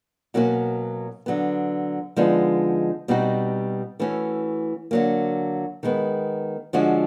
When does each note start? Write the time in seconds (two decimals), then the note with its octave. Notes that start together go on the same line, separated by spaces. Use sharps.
0.34 B2 F#3 A#3 C#4 F#4
1.26 D3 F#3 B3
2.16 D3 F3 G#3 B3 D#4
3.08 B2 G3 C4 D#4 F#4
4.00 E3 A3 C#4 F#4
4.91 D3 F#3 A#3
5.83 D#3 G#3 B3
6.73 D3 F3 G#3 C#4 F#4